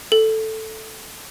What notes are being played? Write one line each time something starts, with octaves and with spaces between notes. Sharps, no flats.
A4